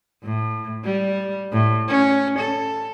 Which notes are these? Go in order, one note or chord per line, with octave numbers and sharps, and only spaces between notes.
A2
G3
A2
C#4
A4